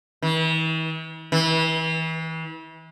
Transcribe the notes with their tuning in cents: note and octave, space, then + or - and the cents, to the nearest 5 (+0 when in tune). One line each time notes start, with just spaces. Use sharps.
E3 -45
E3 -35